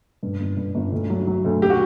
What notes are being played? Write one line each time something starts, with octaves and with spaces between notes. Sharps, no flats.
G2
G1
G2
G1
D2
F#3
F#3
D2
G4
F#4